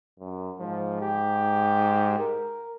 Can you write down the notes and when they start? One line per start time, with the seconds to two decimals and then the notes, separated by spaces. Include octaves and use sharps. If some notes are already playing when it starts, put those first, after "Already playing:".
0.19 F#2
0.59 G#2 F3
1.01 G4
2.19 A#4